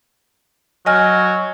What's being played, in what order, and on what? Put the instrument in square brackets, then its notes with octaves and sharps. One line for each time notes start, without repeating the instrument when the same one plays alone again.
[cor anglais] F#3 [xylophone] D#5 G#5 F6